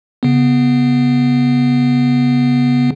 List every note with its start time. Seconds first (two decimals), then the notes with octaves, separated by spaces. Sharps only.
0.23 C#3 B3